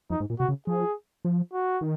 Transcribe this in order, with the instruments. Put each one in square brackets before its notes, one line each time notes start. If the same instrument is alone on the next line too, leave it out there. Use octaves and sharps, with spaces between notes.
[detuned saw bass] F2 [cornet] D#4
[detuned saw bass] G#2
A#2
[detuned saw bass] C3 [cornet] F#4
[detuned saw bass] C#3
[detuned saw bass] F3 [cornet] G#4
[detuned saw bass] F3
[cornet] F#4
[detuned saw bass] D#3